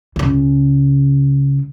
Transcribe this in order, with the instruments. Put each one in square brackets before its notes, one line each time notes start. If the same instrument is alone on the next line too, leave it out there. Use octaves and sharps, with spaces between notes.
[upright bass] C#2 C#3